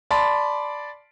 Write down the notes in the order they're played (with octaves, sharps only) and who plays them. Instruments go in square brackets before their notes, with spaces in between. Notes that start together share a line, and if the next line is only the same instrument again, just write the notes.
[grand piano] D5 A5 B5 C6